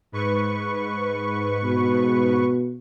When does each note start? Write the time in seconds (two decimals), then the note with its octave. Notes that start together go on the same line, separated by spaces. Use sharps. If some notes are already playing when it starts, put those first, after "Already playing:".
0.12 G#2 B4 C#6
1.64 B2